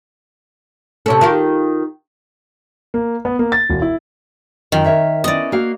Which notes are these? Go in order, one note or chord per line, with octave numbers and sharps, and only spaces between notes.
C3 C#4 A4
D#3 F4 G4
A#3
B3
A#3
A6
E1
E4
F#2 D#3 F4 G5
A#4 C#5 E5
B3 C#4 E4 D5 D#5
A#3 F#4 F5